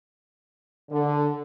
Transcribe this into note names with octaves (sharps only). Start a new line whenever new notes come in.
D3